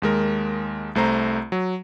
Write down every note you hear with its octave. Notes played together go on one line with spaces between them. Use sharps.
D#2 G#3 A#4
C2 A3 C5 A#5
F#3